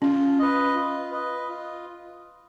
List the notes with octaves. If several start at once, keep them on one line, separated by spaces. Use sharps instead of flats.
C#4 F4
B4 D#5
F4
B4 D#5
F4